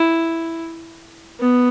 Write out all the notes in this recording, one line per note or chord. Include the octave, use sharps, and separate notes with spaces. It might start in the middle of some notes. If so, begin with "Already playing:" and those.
Already playing: E4
B3